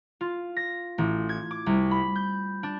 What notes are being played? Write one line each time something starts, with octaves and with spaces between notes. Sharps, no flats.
F4
A#6
A1
G#6
D6
C2
B5
G6
D4